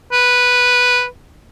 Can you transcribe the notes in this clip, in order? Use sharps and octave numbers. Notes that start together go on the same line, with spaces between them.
B4